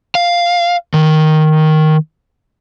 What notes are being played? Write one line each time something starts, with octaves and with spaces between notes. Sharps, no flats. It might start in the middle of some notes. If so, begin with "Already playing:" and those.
F5
D#3